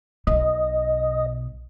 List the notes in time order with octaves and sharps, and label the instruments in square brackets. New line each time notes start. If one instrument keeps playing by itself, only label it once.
[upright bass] B1 B2 [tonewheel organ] D#5